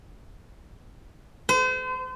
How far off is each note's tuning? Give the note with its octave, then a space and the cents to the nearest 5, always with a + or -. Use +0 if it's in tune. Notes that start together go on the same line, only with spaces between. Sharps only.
C5 -40